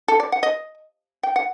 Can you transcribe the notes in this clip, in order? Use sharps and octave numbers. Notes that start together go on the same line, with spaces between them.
A4
D5
F#5
D#5
G5
F#5